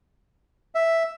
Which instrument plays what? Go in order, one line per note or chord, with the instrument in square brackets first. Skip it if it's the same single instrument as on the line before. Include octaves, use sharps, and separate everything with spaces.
[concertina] E5